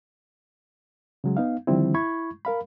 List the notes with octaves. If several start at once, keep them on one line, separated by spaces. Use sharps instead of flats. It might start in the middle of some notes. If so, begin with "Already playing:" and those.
C#3 F#3 G#3
B3 D#4 F5
D3 D#3 F3 G3 C4 E4
E4 B5 C#6 G#6
A#4 F5 B5